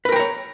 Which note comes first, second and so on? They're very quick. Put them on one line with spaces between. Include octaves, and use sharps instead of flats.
B4 A#4 G5 A#5 C#5